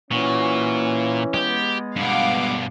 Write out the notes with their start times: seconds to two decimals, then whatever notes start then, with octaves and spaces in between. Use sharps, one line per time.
0.11 A#2 E3 C#4 F#4
1.34 G#3 B3 G4
1.96 G2 B2 F5 F#5 D6